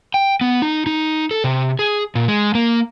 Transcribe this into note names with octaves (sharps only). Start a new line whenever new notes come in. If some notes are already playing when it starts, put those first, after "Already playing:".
G5
B3
D#4
D#4
A4
C3
G#4
A#2
G#3
A#3